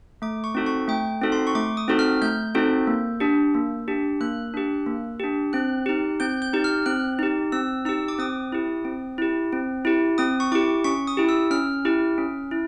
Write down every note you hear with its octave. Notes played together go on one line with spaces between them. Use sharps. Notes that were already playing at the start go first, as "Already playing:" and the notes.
A3 D6
C#6
C4 D#4 F#4 A4
C#6
A3 G5
C4 D#4 F#4 A4
C6
C#6
A3 D6
D#6
C4 D#4 F#4 A4
F6
A3 G6
C4 D#4 F#4 A4
A#3
D4 G4
A#3
D4 G4
A#3 F#6
D4 G4
A#3
D4 G4
C4 F#6
D#4 G4
C4 G6
G6
D#4 G4
F6
C4 F#6
D#4 G4
C4 E6
D#4 G4 E6
D6
C4 D#6
E4 G4
C4
E4 G4
C4
E4 G4
C4 D#6
C#6
E4 G4 D6
C#4 C#6
D#6
E4 G4
E6
C#4 F6
E4 G4
C#4
E4